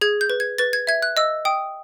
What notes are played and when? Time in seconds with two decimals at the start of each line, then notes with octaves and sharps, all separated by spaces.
0.01 G#4 G#6
0.21 G6
0.30 B4
0.40 G#6
0.58 B4 A6
0.73 G#6
0.87 E5 G#6
1.02 F#6
1.17 D#5 E6
1.45 G5 D#6